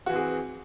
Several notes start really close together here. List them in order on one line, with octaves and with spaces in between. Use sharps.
F#4 E3 C4 G#4